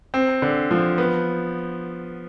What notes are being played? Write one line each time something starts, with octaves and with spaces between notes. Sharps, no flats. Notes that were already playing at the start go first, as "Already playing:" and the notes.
C4
D3
F3
B3